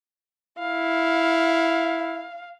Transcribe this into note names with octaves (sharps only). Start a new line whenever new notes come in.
E4 F5